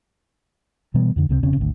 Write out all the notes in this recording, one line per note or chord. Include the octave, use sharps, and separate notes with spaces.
B2 E3 G3 B3
F2 D3
C#2 C3 G#3 C4
F1 C#3 C4 C#4
G#1 D2